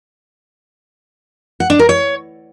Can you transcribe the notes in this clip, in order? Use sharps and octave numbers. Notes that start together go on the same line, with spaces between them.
F#5
D4
A#4
C#5